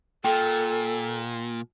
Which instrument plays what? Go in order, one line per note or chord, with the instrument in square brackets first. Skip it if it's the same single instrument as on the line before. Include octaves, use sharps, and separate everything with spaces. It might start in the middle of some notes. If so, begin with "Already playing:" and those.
[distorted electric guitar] A#2 [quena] A4 [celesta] G5